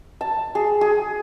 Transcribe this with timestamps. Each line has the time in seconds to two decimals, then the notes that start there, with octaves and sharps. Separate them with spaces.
0.21 A5
0.55 G#4
0.81 G#4